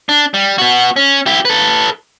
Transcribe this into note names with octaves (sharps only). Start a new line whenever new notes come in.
D4
G3
B3 F#4
C#4
E4 G4
A4 B4